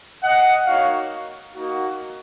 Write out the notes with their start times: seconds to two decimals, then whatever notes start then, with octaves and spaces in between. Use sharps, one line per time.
0.22 D#5 F#5
0.67 A#3 D#4 F#4 C#5 F5
1.55 A#3 D#4 F#4